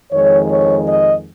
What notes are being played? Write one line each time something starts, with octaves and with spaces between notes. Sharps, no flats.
F2 D#3 G#3 C#5
C#5
D#5